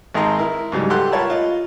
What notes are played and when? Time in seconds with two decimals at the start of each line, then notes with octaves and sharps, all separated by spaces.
0.14 G#1 D#3 G#3 G#4 A#5 C6
0.39 E4 A#4
0.72 G#2 C#3 F#3 G3
0.90 G4 A4 F#5 C6 F#6
1.12 F4 A#4 C#5 A5 B5
1.30 F4 D#5